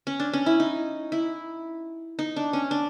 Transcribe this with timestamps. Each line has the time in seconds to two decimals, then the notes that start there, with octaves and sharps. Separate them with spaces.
0.07 C#4
0.20 D4
0.33 C#4
0.46 E4
0.60 D#4
1.12 E4
2.19 D#4
2.36 D4
2.53 C#4
2.71 D4